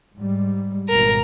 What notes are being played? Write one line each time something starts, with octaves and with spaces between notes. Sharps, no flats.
G#2 G3
G#1 B2 A#4